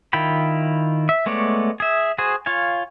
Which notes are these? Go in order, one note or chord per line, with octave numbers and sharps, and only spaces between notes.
D#3 E4 F4 G5 B5
E5
G#3 A3 B3 C#5 D5
G#4 E5
F#4 G#4 C5 G#5
F4 C#5 F5 G#5